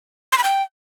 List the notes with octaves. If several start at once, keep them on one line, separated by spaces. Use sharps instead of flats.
C6
B5
G5